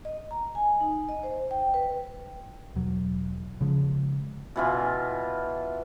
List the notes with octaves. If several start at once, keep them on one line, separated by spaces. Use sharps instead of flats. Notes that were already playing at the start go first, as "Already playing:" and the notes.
D#5
A#5
G#5
D#4
D#5
C5
G5
B4
E1 F#3
C#3 F3 G#3
B2 E3 F4